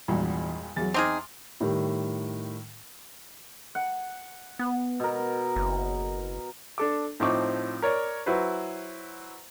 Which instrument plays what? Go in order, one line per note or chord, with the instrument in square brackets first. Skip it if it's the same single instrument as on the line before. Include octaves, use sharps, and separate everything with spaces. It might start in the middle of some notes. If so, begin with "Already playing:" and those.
[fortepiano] G#1 G2 A#2 [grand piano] E2 F#4
[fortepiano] E2 [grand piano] F#3 G#4 A6
[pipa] C4 D#4 G#4 [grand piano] C6 D6 F6
[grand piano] A2 D#3 G3
[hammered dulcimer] F#5
[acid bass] B3
[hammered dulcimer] B2 A#4
[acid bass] F#1
[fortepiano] D4 A4 D6
A2 F3 C4 D#4 C#6 D6
A#4 C#5 D5
F#3 E4 F#4 B4 C5